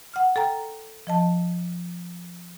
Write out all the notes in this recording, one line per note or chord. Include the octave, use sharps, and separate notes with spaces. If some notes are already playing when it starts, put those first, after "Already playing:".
F#5 F6
A4 G5 A#5
F3 D#5 A5